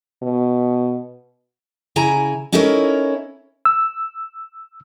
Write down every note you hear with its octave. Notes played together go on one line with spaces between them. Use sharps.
B2
C#3 E4 G#5 A#5
C#4 D#4 E4 A4 A#4 C#5
E6